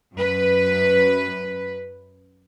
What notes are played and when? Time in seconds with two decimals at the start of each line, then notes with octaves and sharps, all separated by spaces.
0.15 F#2 B4